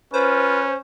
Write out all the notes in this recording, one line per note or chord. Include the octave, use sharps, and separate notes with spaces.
C#4 F4 B4 C5